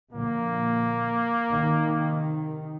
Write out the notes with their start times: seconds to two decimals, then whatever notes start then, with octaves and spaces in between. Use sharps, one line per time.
0.13 A#2 D3 F3 A#3
1.49 C3 D#3